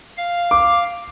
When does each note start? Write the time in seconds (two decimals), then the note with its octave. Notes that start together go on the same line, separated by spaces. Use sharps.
0.17 F5
0.51 D6